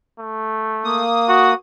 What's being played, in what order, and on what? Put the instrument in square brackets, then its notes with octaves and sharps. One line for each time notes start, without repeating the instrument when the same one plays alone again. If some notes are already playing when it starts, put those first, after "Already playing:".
[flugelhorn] A3
[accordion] A#3 D#6
[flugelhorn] F#4